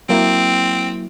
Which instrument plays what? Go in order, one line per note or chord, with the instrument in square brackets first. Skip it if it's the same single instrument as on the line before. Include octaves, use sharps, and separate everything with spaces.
[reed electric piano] F#3 A#3 E4 [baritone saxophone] C4